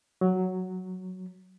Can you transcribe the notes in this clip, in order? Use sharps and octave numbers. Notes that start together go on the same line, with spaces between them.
F#3